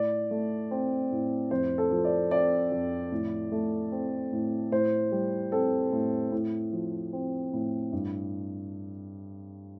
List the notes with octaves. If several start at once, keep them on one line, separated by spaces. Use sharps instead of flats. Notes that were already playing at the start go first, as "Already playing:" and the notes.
Already playing: A2 D5
A3
C4
A2
F2 C5
A4
F3
D5
C4 D5
F2
A2
A3
C4
A2
A2 C5
G3
C4 A4
A2
A2
F3
C4
A2
G2